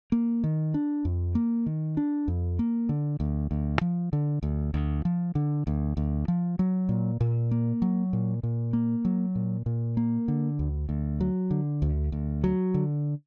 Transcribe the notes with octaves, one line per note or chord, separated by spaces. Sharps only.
A#3
D#3
D4
F2
A#3
D#3
D4
F2
A#3
D3
D2
D2
F3
D3
D2
D2
F3
D3
D2
D2
F3
F#3
A#2
A#2
A#3
F#3
A#2
A#2
A#3
F#3
A#2
A#2
A#3
D3
D2
D2
F#3
D3
D2
D2
F#3
D3